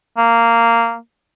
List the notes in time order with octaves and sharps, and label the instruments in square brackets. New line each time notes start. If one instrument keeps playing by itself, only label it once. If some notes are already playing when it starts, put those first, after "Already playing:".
[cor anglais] A#3